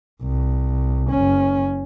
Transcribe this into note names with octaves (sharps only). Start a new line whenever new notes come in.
C2
F#1 C#4